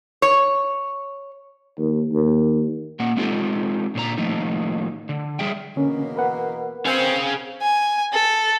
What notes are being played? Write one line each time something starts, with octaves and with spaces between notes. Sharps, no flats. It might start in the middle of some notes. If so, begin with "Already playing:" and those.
C#5
D#2
D#2
A#2 A#3 F#5
G#3 C4 D#4 F4 G4 A4
A#2 D3 C5 A#5
A2 D#3 F3 A3 A#3 D#4
D3
G3 G#4 E5 G5
E2 B2 D3 A#3 C#4
A#4 B4 F#5
C4 G#4 F5
G#5
A4